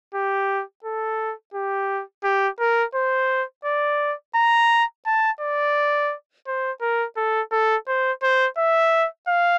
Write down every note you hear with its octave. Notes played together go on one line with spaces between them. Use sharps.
G4
A4
G4
G4
A#4
C5
D5
A#5
A5
D5
C5
A#4
A4
A4
C5
C5
E5
F5